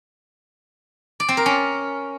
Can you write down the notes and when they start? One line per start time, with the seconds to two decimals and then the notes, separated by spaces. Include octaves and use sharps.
1.20 D5
1.29 C4
1.37 A#4
1.46 C#4